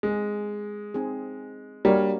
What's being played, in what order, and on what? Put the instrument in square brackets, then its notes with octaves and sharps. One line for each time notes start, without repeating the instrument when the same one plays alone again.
[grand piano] G#3 [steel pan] C4 D#4 G#4
[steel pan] C4 D#4 G#4
[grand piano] G3 [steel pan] A#3 D4 F#4 A#4 C#5